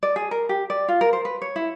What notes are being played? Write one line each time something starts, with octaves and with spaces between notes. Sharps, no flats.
D5
G#4
A#4
G4
D5
F4
A#4
C5
B4
C#5
E4